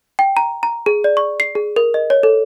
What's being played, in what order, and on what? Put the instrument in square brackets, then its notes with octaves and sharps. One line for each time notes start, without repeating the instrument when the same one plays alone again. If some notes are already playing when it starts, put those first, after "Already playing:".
[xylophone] G5
A#5
A#5
G#4
D5
C#6
C7
G#4
A#4
D#5
C#5
A4